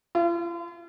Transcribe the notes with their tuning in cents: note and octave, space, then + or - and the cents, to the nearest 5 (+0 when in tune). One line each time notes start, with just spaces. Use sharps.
F4 -45